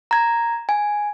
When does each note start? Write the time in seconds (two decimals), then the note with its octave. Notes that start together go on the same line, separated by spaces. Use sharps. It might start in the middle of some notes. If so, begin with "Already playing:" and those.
0.11 A#5 G#6
0.69 G#5